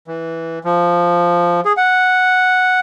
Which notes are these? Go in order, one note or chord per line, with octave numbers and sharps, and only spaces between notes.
E3
F3
G#4
F#5